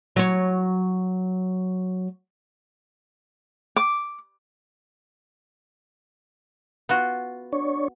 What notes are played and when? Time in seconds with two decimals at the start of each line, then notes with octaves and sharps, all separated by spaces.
0.16 F#3 C#5
3.76 D6
6.89 B3 F4 F#4
7.53 D4 C#5